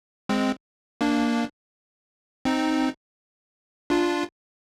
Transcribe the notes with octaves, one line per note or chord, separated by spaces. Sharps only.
G#3 C4
A#3 D4
C4 D#4
D4 F4